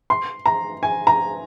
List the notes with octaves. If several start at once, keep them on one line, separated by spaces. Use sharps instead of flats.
C6
A#5
G#5
A#5